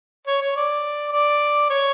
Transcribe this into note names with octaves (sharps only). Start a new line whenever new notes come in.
C#5
C#5
D5
D5
C#5